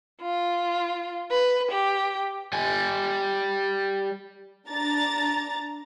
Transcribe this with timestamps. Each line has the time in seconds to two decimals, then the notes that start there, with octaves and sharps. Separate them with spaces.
0.22 F4
1.31 B4
1.72 G4
2.53 G3 G#5
4.69 D4 A#5 A6